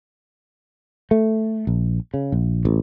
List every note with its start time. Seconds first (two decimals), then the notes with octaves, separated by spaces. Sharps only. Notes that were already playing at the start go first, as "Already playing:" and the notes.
1.11 A3
1.67 A#1
2.14 C#3
2.32 A#1
2.65 A1